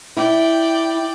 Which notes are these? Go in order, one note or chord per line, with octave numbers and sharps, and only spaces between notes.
E4 D5 G5